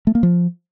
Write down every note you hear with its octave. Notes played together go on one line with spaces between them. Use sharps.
A3
A#3
F3